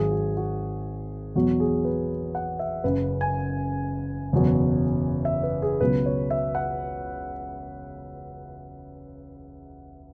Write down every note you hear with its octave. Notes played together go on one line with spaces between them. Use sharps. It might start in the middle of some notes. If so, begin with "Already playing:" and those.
Already playing: G#1 G#2 F#3 G#4
F#4
F#4
E2 B2 F#3 F#4
G#4
B4
F#5
E5
F#1 F#2 C#3 B4
G#5
F#1 E2 B2 F#3
E5
B4
G#4
C#2 B2 F#3 B4
C#5
E5
F#5